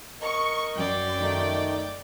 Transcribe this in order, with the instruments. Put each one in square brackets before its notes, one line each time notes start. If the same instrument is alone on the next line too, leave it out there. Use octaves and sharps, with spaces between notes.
[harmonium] A#4 D#5 [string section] C#6
[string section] F#2 [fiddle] D5 G5
[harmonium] D#3 A3 D#4